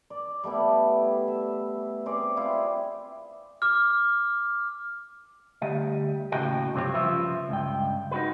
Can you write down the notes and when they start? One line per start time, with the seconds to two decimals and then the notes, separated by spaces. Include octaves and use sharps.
0.10 D5
0.44 G3 A3 B3 E4
1.28 E5
2.06 C4 G#4 C#5 D5
2.36 C4 E4 F4
3.62 D6 F6
5.62 D2 G3 D#5
6.32 D#2 A2 C#3 F#4 D#5 G5
6.74 G2 C3 F#3 C4 F4 C#5
6.94 C#3 F3 F4 B4 E5
7.49 C#2 G2 G5
8.11 D#4 F#4 B4